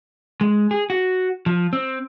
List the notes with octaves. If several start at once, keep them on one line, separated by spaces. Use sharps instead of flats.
G#3
G#4
F#4
F3
C4